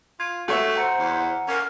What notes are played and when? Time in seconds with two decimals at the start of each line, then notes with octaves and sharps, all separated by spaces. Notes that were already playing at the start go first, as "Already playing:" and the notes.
0.20 F4 G#6
0.48 A3 F#4 C#5 E5
0.76 C5 F#5 A#5 C#7
0.99 E2
1.48 C#4 A#4